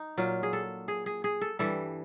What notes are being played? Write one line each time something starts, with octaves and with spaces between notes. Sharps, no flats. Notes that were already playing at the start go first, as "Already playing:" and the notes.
Already playing: D#4
A#2 F#3 F4
G#4
A4
G#4
G#4
G#4
A4
G2 E3 G3 A4